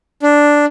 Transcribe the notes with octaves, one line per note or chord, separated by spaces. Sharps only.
D4